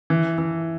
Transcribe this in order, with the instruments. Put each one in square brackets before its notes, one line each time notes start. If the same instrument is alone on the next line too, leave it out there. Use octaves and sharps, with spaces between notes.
[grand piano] E3
E3